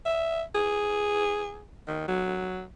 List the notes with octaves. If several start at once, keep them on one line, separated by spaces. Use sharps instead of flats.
E5
G#4
D#3
F#3